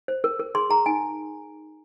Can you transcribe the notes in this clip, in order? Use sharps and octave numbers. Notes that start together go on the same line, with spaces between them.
C5
A#4
A#4
G#4 C6
G#4 A#5
D#4 G#5